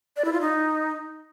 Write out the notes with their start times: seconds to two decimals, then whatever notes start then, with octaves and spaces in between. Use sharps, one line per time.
0.17 D5
0.25 E4
0.33 F4
0.41 D#4